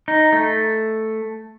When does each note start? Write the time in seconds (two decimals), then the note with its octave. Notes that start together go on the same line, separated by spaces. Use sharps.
0.08 D#4
0.33 A3